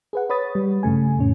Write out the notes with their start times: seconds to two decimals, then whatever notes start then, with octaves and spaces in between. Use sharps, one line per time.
0.13 G#4 B4 F#5
0.30 B4 C#5 B5 D#6 A6
0.55 G3
0.83 G2 C#3 A3 G#5
1.18 F2 A2 C#4